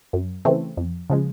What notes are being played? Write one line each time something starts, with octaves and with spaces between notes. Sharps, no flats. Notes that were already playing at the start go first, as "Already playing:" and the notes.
F#2
C#3 E3 A3 C4
F2
C#3 F3 G#3